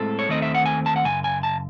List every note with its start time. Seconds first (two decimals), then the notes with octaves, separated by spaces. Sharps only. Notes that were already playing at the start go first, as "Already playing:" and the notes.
Already playing: A2 G#3 C4 A4
0.19 C#5
0.28 D#2 D#3 A3 C4 D#5
0.42 E5
0.55 F#5
0.66 G#5
0.86 A5
0.96 F#5
1.05 F#2 C#3 G#5
1.24 G#5
1.43 A5